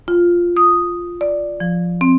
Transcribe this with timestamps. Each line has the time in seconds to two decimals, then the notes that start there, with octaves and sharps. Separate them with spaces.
0.08 F4
0.57 D#6
1.21 D5
1.60 F3
2.01 C4